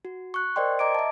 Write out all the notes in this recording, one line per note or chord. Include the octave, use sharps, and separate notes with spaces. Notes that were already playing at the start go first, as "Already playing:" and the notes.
F#4
C#6 F#6
A#4 C5 D5 D#5 G5 C6
D#5 A#5 D6 G#6 D7
E5 A5